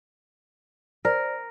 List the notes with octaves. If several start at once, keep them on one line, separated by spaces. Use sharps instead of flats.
A#4 C5 D5